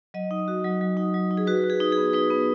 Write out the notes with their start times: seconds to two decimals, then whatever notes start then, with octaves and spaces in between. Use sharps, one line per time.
0.14 F#3 D#5
0.31 D#4
0.48 F#4
0.64 F#3
0.81 F#3
0.97 D#4
1.14 F#3
1.31 D#4
1.37 G#4
1.47 F#4 B4
1.64 F#4
1.70 G#4
1.80 D#4
1.92 G#4
1.97 B3
2.13 D#4 B4
2.30 B3